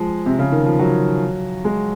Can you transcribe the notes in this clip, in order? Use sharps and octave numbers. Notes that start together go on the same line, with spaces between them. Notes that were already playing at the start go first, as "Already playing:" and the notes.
Already playing: F3 G#3
C3
C#3
D#3
F3
F#3
G#3